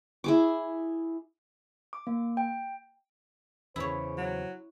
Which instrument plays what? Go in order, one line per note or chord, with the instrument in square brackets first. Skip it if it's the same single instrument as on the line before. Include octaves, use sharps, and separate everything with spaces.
[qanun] E4 G#4 D6
[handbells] D6
A#3
G5
[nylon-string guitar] E2 C#3 [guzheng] E4 C#5 [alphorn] C5
[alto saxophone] F#3